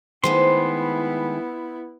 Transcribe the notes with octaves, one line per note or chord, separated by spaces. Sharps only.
D#3 G#3 A3 B3 E4 C5 C6